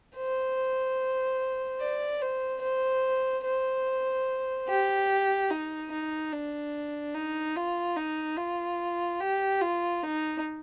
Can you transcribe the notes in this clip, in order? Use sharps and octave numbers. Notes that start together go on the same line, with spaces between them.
C5
D5
C5
C5
C5
G4
D#4
D#4
D4
D#4
F4
D#4
F4
G4
F4
D#4